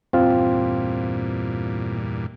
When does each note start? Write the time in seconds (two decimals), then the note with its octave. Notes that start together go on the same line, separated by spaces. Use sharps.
0.13 E2 G2 A#2 C4 F4